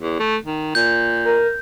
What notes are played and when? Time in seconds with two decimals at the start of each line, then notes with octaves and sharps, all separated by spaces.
0.02 E2
0.20 A3
0.46 D#3
0.75 A#2 G6
1.25 A#4